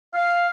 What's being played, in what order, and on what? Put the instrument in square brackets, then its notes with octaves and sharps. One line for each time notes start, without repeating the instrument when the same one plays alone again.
[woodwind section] F5